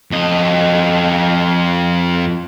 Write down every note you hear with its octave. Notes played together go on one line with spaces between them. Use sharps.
F2 D#5